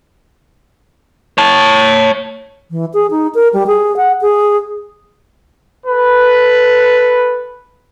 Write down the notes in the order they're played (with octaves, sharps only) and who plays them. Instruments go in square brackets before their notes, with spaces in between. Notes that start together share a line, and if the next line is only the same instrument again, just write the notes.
[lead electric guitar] C#5 A5
[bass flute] E3
G#4
D#4
A#4
G3
G#4
F#5
G#4
[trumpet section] A4 B4